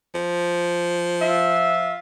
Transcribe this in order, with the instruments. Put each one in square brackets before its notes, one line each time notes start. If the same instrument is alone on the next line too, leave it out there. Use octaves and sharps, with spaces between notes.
[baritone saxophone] F3
[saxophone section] F4 E5